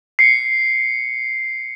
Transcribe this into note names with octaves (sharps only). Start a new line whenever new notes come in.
C7 C#7